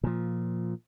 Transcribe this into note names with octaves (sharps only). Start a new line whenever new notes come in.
A#2 F3